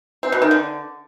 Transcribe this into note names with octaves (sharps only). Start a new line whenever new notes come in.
C4
B2
D#3
D3